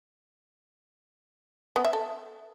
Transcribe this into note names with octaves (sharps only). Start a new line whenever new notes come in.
B3
E5
A4